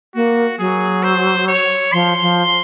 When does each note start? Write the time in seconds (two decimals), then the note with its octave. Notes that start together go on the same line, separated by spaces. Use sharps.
0.15 A#3 F#4
0.58 F#3 G#4
1.03 C5
1.48 C#5
1.93 F3 C6
2.22 F3